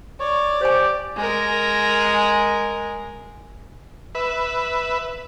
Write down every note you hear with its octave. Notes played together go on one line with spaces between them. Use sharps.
C#5 D5
G4 C5 G#5
G#3 A#4
B4 E5